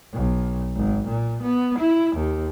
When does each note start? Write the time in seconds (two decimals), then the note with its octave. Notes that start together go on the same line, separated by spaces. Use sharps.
0.13 B1
0.76 G#1
1.07 A#2
1.43 B3
1.78 E4
2.16 D#2